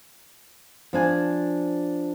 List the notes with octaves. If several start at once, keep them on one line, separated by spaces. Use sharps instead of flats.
F3 D4 G#5